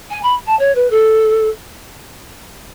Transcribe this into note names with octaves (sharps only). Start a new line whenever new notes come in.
G#5
B5
A5
C#5
B4
A4